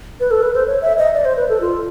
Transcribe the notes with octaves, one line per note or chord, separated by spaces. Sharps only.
B4
A4
B4
C5
C#5
E5
D#5
D5
C5
B4
A4
F4